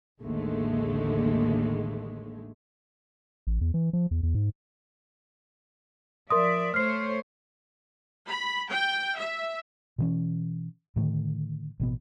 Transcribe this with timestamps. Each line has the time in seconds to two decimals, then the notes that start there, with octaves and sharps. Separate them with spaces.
0.22 A1 D#2 D3 G#3 A3
3.47 A1
3.61 E2
3.74 E3
3.93 F3
4.11 E2
4.23 E2
4.35 G#2
6.31 F3 A#4 D5 E5 C6 D#6
6.74 A3 C5 C#5 F6 C7
8.28 B5
8.71 G5
9.16 E5
9.98 B2 E3 C#4
10.96 A2 D3 D#3 A3
11.80 A1 B2 B3